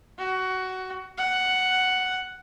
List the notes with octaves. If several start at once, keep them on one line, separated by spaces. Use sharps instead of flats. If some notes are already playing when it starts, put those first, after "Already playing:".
F#4
F#5